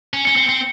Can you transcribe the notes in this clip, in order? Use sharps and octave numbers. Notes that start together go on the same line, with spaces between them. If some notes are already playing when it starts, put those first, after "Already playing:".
C#4
C#4 C#7 G7
C4
C4